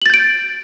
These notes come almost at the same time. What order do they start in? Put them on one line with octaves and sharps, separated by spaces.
F#7 A6 G6 D7